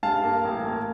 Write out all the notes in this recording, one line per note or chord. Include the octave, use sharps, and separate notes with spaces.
G2 F5 A5
A#3
A1
A#3